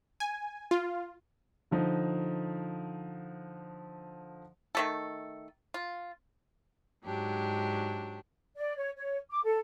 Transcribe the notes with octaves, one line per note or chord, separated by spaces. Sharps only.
G#5
F4
D3 F3 D#4 D#5
D#3 A3 A4
F4
G#2 F#3 D4 G4
D5
C#5
C#5
D6
A4